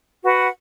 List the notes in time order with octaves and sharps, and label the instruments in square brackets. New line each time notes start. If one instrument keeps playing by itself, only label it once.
[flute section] F#4 B4 F#5 B5